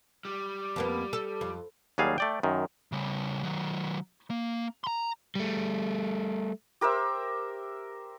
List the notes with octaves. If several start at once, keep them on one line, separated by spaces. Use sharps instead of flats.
G3
F2 A#3 B3
A4
F2
D#2 F#3 G3 G#4 F5
A3 D5 G5
F#2 D#3
C#3 G3
D#3 F#3
A#3
A#5 C6
G3 A3
G4 A#4 C5 E5